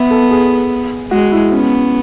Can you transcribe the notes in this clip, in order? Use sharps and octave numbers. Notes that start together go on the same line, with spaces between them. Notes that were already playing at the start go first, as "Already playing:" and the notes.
Already playing: B3 E5
A4
G#4
G#3 F#4
E4
B3 C#4